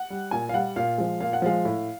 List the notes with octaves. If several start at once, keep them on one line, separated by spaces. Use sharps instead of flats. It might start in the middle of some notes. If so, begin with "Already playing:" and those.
Already playing: F#5
G3
A#2 G#5
F5
G3 F#5
A#2 F5
F3 G#3
A#2 F5
F#5
F3 G#3 F5
A2